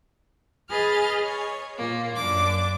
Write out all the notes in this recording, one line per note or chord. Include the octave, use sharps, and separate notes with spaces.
G#4 B4 D#5 F6 A6
C#5
A#2 A#3 F4
F#2 D4 D6